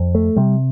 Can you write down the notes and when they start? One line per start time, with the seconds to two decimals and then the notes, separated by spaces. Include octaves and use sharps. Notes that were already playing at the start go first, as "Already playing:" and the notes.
Already playing: F2
0.15 A3
0.36 C3 G3